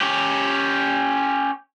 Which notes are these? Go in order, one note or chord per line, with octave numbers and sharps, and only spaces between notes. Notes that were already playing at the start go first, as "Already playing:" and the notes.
C#4 G4